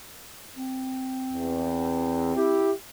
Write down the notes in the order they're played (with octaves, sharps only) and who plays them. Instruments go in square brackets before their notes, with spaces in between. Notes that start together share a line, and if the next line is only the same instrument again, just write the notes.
[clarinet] C4
[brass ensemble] E2
E4 G4